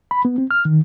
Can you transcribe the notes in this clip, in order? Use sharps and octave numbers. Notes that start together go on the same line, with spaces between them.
B5
B3
C4
F6
D#3